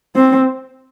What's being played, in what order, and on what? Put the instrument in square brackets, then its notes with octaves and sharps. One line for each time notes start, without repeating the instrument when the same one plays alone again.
[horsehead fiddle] C4